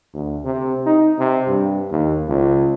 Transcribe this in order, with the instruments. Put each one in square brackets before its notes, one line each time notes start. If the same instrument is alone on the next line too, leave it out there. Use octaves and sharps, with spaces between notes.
[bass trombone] D2
C3
D#4
C3
G2
D#2
C#2